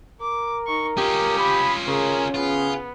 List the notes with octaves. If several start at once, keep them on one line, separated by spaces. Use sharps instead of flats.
A#4 D6
D#4 C#6
C#4 F4 G4 D#6
B5
C#3 G#4 A#4
B3 F4 G#4